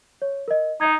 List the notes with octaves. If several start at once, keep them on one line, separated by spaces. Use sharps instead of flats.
C#5
A#4 D#5
D#4 D#5 G#6